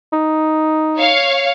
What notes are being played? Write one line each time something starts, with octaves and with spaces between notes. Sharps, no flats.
D#4
C#5 F5 C#7